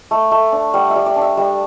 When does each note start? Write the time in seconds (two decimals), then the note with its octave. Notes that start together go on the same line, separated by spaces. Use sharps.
0.11 A3
0.31 A3
0.52 D4
0.74 G3 F#5
0.90 E5
0.96 G3
1.06 D5
1.16 D4
1.21 E5
1.37 G3 E5